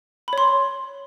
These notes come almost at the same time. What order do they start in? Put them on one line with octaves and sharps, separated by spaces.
B5 C#5 C6